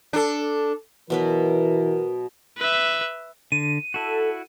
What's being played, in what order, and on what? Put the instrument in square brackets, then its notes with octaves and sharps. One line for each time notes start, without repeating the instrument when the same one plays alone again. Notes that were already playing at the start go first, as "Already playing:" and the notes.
[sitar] D4 A4
[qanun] B2 F#3 B4 [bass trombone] E3 [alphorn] A#4
[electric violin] B4 E5
[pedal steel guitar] D3 [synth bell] D#7
[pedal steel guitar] E4 F#4 [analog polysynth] A4